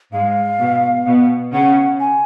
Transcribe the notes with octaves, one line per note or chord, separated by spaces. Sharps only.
G#2 G#3 F5
B2 B3
B2 B3
C#3 C#4 F#5
G#5